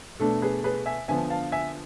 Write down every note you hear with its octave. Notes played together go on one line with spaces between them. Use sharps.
B2 A3 D4 A4
G#4 B4
G#4 B4
E5 G#5
D3 F3 B3 E5 G#5
F5 A5
E5 G#5